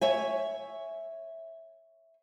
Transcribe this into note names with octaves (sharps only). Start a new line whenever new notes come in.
C#5 E5 G#5